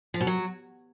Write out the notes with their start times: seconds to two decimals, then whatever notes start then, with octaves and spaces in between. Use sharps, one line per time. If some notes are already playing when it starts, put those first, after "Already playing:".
0.14 F3
0.21 B2
0.27 F#3